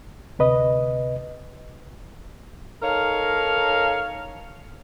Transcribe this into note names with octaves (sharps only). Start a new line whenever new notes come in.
D2 C3 B4 D#5
D#4 A4 A#4 C#5 F5